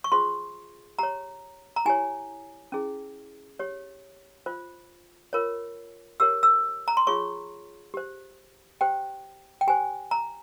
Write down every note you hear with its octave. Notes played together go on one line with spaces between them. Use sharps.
C#6
F4 G#4 C5 C6
G4 C#5 A#5
A#5
E4 G4 C#5 G#5
C#4 E4 G#4
G4 C#5
F4 C5
F4 A#4 C#5
G4 A#4 C#5 E6
E6
A#5
C6
F4 G#4 C#5 C#6
G4 C5
G4 C5 G5
G5
G4 C5 G#5
A#5